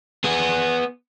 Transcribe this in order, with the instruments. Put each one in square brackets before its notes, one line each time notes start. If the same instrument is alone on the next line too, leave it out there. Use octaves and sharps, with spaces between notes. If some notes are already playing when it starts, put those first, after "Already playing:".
[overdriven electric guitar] B3 G#4